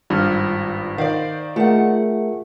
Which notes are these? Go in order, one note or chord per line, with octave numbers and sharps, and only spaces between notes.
G#1 G2 F4 F6
D#3 C5 D5 F5
A3 F4 G#4 A#4 F#5